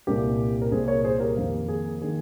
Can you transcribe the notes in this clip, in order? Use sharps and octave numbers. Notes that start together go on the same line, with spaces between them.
C2 A#2 G3 G4 A#4
A#4
C2 A#2 G3 G#4 C5
A#4 C#5
G#4 C5
G4 A#4
F2 D#3 A#3
G#4
D#3 A#3 G#4